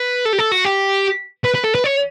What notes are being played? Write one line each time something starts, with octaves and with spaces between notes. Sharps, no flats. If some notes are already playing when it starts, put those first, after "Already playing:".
Already playing: B4
A4
G4
A4
F#4
G4
B4
B4
A4
B4
C#5